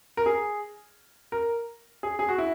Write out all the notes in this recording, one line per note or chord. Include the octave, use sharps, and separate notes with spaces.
A#4
G#4
A#4
G#4
G#4
F#4
E4